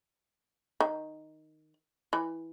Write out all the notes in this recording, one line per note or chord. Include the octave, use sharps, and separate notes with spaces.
D#3
E3